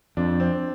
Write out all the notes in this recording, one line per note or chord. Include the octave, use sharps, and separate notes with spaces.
F2 D4
C4